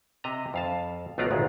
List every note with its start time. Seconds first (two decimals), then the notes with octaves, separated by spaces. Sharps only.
0.24 C3 D#5 E5 A#5
0.54 F2 F5 A5
1.18 B1 A3 B3 F4 D5 A#5
1.30 G#1 D2 A#2 G#3